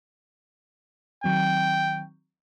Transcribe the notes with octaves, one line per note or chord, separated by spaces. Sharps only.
D#3 F#3 C4 G5